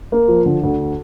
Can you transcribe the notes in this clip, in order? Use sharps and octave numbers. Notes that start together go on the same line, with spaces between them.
A#3
F3
D3
D2